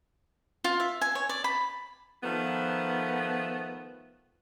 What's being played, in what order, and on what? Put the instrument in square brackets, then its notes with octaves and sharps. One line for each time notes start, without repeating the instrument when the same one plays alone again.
[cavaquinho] F4
E5
G#5
C#5
D5
B5
[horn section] D#3 F3 A3 B3